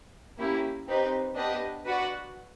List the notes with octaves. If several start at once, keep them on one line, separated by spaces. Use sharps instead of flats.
A#3 C#4 E4 G4
C4 D#4 G4 B4
B3 D4 G4 B4 D#5
F#4 B4 D5 F#5